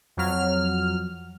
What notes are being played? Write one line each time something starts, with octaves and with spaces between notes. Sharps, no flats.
F2 F#3 F6